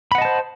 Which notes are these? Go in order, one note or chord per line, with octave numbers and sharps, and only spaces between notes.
C5 D#5 F#5 A5 B5